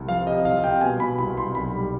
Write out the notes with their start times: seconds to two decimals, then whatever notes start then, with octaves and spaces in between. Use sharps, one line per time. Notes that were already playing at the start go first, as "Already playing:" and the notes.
Already playing: C2
0.09 F3 F5
0.27 C3 D#5
0.44 C2 F5
0.63 C3 G5
0.81 B2 G#5
1.00 B2 B5
1.18 C2 B5
1.37 C2 C6
1.55 B1 B5
1.74 G3